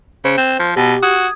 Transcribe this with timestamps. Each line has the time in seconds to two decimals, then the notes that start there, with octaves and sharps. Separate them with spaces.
0.25 C#3 C5
0.37 C4
0.59 F3
0.76 B2 G4
1.03 F#4 D#6 G#6